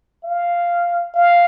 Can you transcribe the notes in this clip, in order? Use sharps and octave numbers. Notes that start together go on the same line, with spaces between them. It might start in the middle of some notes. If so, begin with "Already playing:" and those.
F5
F5